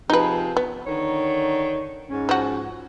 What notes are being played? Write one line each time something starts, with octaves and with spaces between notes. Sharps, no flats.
C3 F3 D#4 G#4 B4
B3
D3 D#3 C#5
G#2 C#4
F3 F#4